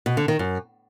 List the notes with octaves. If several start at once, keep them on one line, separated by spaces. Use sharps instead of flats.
B2
D3
D#3
F#2